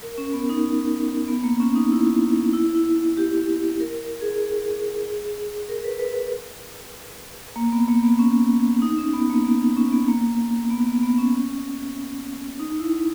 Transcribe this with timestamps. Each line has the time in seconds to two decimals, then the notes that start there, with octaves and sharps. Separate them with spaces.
0.03 A#4
0.18 C#4
0.33 B3
0.50 D#4
1.28 B3
1.44 A#3
1.60 C#4
1.75 D#4
1.92 E4
2.53 E4
2.75 E4
2.96 E4
3.17 G4
3.80 A#4
4.21 G#4
5.69 A#4
5.84 B4
5.99 B4
7.56 A#3
7.73 B3
7.89 A#3
8.04 B3
8.19 C#4
8.82 D#4
8.97 C#4
9.14 B3
9.30 A#3
9.45 B3
9.77 C#4
9.93 B3
10.08 A#3
10.70 B3
10.86 B3
11.03 B3
11.18 C#4
12.59 D#4
12.79 E4